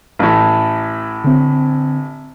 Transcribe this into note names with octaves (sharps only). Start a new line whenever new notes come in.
A1 A2
D3 C4